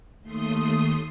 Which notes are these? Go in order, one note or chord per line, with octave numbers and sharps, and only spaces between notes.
D#2 A3 C6 D#6